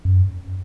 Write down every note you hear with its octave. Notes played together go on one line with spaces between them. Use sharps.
F#2